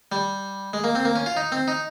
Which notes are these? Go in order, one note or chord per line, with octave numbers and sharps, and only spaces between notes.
G3
G#3
A#3
C4
A#3
C#4
F4
D#4
C4
D#4